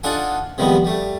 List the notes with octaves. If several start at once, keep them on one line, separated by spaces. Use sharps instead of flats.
D4 D#4 F4 A4 F#5 G#5
C3 D#3 F3 G3 G#3 B3
G3 A3